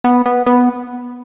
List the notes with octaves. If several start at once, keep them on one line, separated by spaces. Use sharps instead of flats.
B3
B3
B3